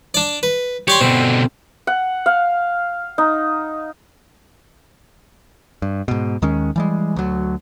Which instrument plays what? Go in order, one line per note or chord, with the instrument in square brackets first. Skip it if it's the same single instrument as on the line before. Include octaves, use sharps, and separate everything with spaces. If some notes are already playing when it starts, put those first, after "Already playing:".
[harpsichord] D4 D5
B4
[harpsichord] G4 D5 C6 [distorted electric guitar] C#5
[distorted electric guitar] B2 D3 [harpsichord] C4
[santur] F#5
F5
D#4
[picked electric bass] G2
G#2 B2
D#2 D#3 G#3 C#4
E3 G3 G#3
D2 F#3